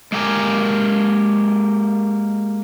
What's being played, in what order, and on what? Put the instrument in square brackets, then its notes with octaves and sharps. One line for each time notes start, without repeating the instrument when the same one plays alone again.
[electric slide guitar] G#3 A#3 G4 A#4 G#5